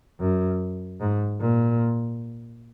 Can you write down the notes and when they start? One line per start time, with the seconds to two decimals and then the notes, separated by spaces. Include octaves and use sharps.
0.20 F#2
1.01 G#2
1.40 A#2